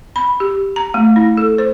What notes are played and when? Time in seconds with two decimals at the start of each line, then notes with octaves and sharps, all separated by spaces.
0.16 B5
0.40 G4
0.76 A#5
0.94 A3
1.16 E4
1.37 A4
1.58 C5